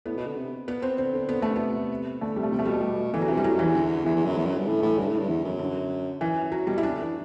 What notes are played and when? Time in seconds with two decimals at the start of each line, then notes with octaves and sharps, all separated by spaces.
0.06 A2 B3
0.16 B2
0.26 D3
0.36 C3
0.68 B3
0.82 C4
0.97 D3 C4
1.14 D3
1.28 D3 B3
1.39 D3 A3
1.50 C3
1.56 B3
2.21 D3 A3
2.36 C3 G3
2.43 A3
2.51 C3 G3
2.59 A3
2.65 B2 G3
2.74 A3
2.80 G3
3.13 D3 E3
3.21 F#3
3.28 C3 E3
3.37 G3
3.44 A2 F#3
3.55 F#2
3.59 E3
3.64 E2
3.75 D3
4.05 E2 E3
4.15 E2
4.26 F#2
4.37 E2
4.46 F#2
4.57 G2
4.67 A2 D3
4.82 A2 E3
4.98 G2 D3
5.08 A2
5.19 G2
5.29 E2
5.44 F#2
5.59 D3
6.21 F#2 E3
6.52 F#3
6.67 B2 G3
6.78 E4
6.83 C3 D4
6.92 D3
7.03 E3